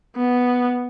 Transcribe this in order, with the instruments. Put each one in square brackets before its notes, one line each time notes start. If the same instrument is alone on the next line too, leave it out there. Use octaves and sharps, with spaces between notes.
[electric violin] B3